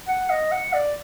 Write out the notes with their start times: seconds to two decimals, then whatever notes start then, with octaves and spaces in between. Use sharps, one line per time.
0.08 F#5
0.30 D#5
0.52 F#5
0.74 D5